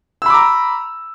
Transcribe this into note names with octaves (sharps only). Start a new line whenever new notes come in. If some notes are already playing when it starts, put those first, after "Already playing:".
A#5 B5 D6 E6